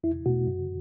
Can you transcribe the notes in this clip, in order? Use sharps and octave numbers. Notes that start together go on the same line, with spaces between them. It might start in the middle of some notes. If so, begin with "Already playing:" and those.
E2 E4
B2 A3 F#4
F#2